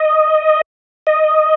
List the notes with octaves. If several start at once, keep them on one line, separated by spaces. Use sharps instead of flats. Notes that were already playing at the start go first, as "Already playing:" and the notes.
Already playing: D#5
D#5